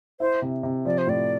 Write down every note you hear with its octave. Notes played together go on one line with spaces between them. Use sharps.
E4 C5
C3
C3
F3 D5
C5
A2 D5